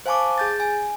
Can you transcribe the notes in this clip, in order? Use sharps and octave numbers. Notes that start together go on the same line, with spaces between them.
C5 F5 G#5 A5 C#6 D6
G#4 G6 A6
G#5